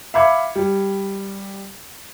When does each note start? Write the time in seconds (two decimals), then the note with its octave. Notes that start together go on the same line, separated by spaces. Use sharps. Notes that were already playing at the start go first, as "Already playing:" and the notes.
0.14 E5 F5 B5 D6 G#6 C#7
0.55 G3